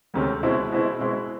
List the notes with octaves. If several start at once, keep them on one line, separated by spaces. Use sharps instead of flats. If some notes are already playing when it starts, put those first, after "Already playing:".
D2 C3 D#3 G#3 C#4
B2 G#3 C4 E4
B2 G#3 C4 E4
B2 G#3 C4 E4